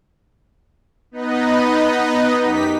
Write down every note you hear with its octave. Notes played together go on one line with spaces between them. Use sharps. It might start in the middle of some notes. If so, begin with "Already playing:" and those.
B3 D#4 B4 D#5
F#2 D#4 G4 B6